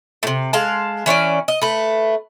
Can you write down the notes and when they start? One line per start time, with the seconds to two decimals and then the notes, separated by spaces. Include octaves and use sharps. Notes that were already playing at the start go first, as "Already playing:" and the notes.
0.23 A2 C3
0.53 G#3 F5 A5
1.06 E3 C#4 C#5 D5
1.48 D#5
1.61 A3 B4